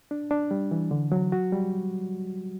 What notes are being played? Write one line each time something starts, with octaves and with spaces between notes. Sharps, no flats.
D4
D4
G3
E3
D3
F#3
F#4
G3